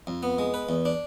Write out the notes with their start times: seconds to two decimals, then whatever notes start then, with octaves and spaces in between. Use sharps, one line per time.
0.07 F2
0.23 B3
0.38 G#3
0.54 B4
0.69 E2
0.85 D4